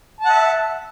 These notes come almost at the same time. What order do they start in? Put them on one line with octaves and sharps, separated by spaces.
A5 F#5 E5